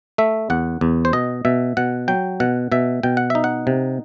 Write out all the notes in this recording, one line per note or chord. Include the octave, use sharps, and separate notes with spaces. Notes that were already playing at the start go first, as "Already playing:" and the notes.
A3 E5
E2 F#5
E2
C5
B2 D#5
B2 E5
B2 F#5
F#3 G5
B2 F#5
B2 E5
B2 G5
F#5
D#4 E5
F#5
C3